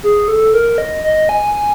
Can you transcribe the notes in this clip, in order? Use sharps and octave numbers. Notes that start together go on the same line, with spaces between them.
G#4
A4
A#4
D#5
D#5
G#5
G#5